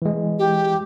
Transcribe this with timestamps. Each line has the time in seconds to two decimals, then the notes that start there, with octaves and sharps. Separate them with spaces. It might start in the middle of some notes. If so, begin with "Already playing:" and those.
0.02 E3 G#3
0.39 G4